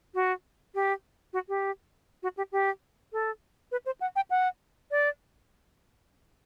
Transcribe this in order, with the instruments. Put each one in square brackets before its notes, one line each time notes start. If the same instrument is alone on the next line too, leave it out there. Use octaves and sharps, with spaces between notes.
[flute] F#4
G4
F#4
G4
F#4
G4
G4
A4
B4
C5
F#5
G5
F#5
D5